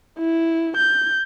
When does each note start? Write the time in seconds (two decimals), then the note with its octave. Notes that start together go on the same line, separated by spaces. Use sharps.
0.20 E4
0.77 G6